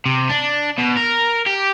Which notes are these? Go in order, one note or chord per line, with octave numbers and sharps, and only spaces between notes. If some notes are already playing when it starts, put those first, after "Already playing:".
C3
D4
B2
A#4
G4